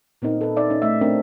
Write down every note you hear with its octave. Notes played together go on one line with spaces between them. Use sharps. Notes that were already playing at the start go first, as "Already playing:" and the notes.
A#2 B3 C4 D#4 A#4
A4 B4
D#4 D5 E5
C#4 D#4
A3 E5
A3 C4 D4 A#4